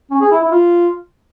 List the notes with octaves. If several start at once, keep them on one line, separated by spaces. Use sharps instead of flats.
C#4
G#4
E4
E4
F4